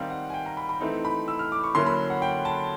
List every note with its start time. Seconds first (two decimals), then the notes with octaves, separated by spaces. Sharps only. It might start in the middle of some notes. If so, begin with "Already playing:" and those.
Already playing: D#3 G3 C4 D#4 F5
0.10 F#5
0.30 G#5
0.34 G5
0.46 A#5
0.57 B5
0.69 B5
0.80 E3 A3 C4 D#4
1.05 B5
1.28 E6
1.39 F6
1.52 D6
1.64 C#6
1.75 D3 F#3 A#3 C#4 E4 C6
1.86 B5
2.10 F#5
2.22 G5
2.45 A5